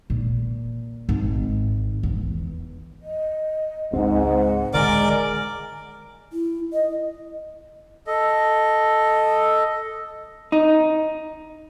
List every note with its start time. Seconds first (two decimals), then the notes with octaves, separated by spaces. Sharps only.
0.10 A#2
1.09 G#1
2.03 E2
3.02 D#5
3.93 C#2 G#2 C4 F#5
4.74 D1 D3 D#3 G#3 A#4 D5 G#5 D6
6.33 E4
6.73 D#5
8.07 A4 D#5
10.52 D#4